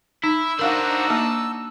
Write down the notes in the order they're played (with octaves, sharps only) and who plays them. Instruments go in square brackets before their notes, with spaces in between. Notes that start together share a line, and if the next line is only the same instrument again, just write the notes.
[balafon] D#4 [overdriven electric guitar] E4 [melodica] E6
[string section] D4 D#4 F#4 [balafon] A#4 F5 [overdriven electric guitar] C5 F#5
[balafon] A#3 [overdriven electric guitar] A5